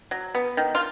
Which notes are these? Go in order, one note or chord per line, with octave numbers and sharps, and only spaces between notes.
F#3
B3
D#3
F4